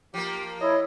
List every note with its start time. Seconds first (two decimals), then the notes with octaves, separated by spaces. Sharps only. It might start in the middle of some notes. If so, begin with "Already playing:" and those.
0.14 F3 A#3 G4
0.61 E4 C#5 D#5